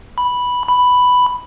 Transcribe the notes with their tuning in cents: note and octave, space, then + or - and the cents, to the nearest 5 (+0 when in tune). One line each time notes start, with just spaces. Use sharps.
B5 -5
B5 +5